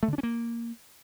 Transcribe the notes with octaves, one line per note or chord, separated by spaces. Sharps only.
A3
D3
D4
C#4
A#3